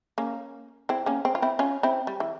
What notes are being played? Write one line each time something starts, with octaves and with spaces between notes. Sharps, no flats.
A#3 C#4
C4 E4
A#3 C#4
C4
F4
C4 E4
C#4 F4
C4 E4
G3
E3